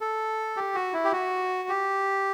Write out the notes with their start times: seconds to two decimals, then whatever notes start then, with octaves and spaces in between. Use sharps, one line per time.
0.01 A4
0.57 G4
0.75 F#4
0.93 E4
1.05 G4
1.13 F#4
1.69 G4